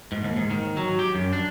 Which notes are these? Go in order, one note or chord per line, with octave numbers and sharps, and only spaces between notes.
G#2
D#2
G#2
D#3
F#3
G4
F#2
D4